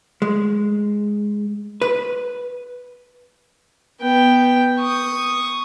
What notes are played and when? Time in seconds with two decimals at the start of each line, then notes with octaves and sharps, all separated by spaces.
0.22 G#3
1.82 B4
4.02 B3 G5
4.79 C#6 D#6